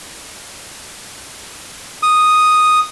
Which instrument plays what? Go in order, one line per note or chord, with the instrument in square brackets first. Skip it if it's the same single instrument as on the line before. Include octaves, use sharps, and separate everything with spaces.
[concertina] D#6